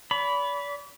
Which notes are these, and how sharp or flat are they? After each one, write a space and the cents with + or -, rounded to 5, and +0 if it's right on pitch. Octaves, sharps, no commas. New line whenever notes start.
D5 -40 B5 +0